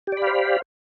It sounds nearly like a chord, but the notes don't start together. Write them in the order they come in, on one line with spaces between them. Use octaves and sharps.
G4 D5 B5 F5 C5